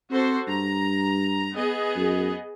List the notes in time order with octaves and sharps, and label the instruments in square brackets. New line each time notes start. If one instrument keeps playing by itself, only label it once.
[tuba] C4 [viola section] F#4 A4 C5
[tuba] G2 [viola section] A#5
[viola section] B3 G#4 D#5
[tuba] F#2